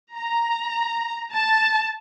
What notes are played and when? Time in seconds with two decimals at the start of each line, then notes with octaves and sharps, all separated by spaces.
0.15 A#5
1.31 A5